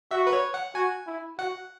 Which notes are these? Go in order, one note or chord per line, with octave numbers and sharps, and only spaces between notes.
F#4 E5
B4
C#5
F#5
F#4 G#5
E4
F#4 F#5